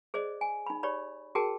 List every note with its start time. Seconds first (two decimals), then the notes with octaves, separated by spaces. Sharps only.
0.14 G#4 C5 D5 D#5
0.41 G#5
0.66 D#4 B5
0.83 G4 C#5 D5 B5
1.35 F#4 G#4 A#4 G5 A5